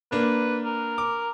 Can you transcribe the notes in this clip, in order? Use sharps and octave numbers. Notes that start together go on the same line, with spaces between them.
A#3 D4 B4
A#4
D6